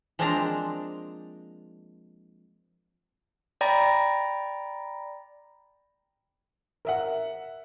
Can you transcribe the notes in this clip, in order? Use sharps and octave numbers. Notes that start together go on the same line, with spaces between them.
F3 G#3 A#3 C4 D4 A#5
D5 G5 A#5 B5 A#6
A#4 E5 F#5